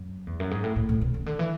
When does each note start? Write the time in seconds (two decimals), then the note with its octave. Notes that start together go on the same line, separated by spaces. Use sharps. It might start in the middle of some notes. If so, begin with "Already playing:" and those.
Already playing: F#2
0.27 E2
0.40 F#2
0.51 G#2
0.64 A2
0.76 A2
0.89 A2
1.01 B2
1.14 C#3
1.26 D3
1.39 E3